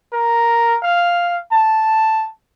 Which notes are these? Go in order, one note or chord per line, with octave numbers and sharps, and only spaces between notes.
A#4
F5
A5